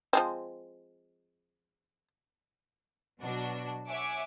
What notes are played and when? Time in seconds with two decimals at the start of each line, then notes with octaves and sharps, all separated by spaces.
0.13 F3 G#3 C4
3.21 B2 F#3 D4 F#4
3.89 C#5 E5 F#5 G#5 D6